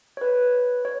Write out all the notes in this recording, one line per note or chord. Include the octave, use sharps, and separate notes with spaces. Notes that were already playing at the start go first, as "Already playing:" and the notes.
C#5
B4
C#5